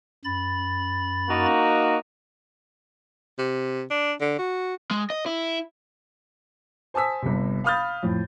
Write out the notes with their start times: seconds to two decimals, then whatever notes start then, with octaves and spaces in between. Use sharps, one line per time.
0.25 F#2 B5 A6
1.29 A#3 D#4 F#4
3.39 C3
3.90 D4
4.21 D3
4.39 F#4
4.91 G#3
5.10 D#5
5.26 E4
6.94 C5 G#5 A5 D#6 E6 B6
7.22 G1 G2 C3
7.64 F5 B5 D#6 F6 G6 A6
8.03 F2 A2